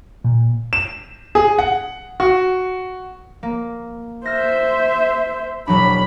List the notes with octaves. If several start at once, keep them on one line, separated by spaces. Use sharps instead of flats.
A#2
E7
G#4
F#5
F#4
A#3
C5 E5 F6 A#6
E1 F#3 D4 B5